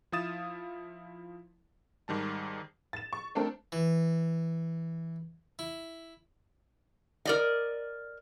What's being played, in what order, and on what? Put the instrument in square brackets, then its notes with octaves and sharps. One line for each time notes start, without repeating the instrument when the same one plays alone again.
[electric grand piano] F3 E4 F5 D#6 A6 E7
G#2 D#3 G3 A5
[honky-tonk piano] A6 E7
C#6
A3 C4 D4 A4 A#4
[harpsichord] E3
E4
[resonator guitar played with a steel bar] A#4 D5 D#5